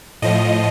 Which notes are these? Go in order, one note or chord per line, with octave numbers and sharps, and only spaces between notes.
A2 F3 D#5